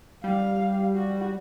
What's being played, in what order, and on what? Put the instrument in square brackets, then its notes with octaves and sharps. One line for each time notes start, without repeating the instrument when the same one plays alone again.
[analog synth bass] G3 [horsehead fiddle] F5
[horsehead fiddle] F#4